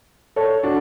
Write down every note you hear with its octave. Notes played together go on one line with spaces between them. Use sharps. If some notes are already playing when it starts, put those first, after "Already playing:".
A4 C#5
D4 F#4